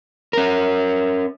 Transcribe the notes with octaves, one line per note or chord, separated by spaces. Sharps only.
C#4 A#4